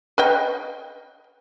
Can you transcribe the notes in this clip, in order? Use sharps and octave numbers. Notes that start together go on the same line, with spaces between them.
B4 D#5 G5